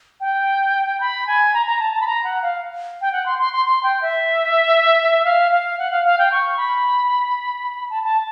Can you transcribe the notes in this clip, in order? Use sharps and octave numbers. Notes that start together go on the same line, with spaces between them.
G5
B5
G#5
A#5
A#5
A5
A5
B5
A#5
F#5
F5
G5
F#5
C6
C6
C6
C6
G5
E5
F5
F5
F#5
F5
F5
G5
C#6
B5
A5
A5